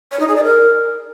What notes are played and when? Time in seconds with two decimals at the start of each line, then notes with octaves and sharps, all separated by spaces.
0.11 C#5
0.19 D#4
0.27 G#4
0.35 D5
0.43 A#4